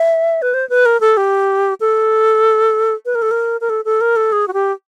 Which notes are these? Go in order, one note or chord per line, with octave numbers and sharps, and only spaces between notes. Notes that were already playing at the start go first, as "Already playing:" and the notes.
Already playing: E5
B4
C5
B4
A#4
A4
G4
A4
B4
A#4
A4
A#4
A#4
A4
A4
A#4
A4
G#4
F#4
G4